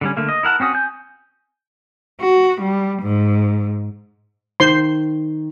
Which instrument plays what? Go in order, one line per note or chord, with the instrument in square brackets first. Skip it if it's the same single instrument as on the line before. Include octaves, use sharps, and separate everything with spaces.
[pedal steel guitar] D3 G3 C#4
D3 A3 A#3
D#5
E4 A#4 F#5 A5
C4 C#4 F#4 D#6
G#5 G6
[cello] F#4
G3
G#2
[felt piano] D#3 [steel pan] C5 C6